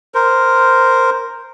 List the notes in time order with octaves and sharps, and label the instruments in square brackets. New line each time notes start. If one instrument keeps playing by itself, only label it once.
[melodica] A#4 C5